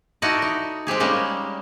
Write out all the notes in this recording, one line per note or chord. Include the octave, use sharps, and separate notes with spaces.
D#4 E4 F#4 A4 D5 D#5
D#4
G#3 C4 G4 G#4
G3 G#3 A#3 C#4 D#4